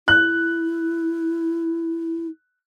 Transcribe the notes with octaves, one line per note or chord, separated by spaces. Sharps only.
E4 F#6